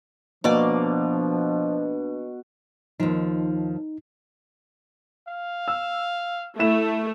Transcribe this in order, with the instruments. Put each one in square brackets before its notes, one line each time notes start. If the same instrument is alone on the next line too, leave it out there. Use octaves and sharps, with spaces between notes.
[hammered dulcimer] B2 [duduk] F3 [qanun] A#3 D5 D6 [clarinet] D4
[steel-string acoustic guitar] D#2 F3 [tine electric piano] D#4
[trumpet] F5
[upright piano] E6
[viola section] A3 [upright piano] E4 E7